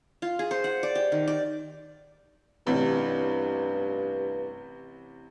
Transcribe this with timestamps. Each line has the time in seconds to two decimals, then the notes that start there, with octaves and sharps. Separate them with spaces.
0.22 F4
0.39 G#4
0.51 C5
0.64 F#5
0.83 D5
0.95 G4
1.12 D#3
1.28 D5
2.67 A1 G2 C3